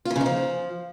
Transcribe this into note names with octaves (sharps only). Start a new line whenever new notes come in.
F4
E3
C#3
D#4
F3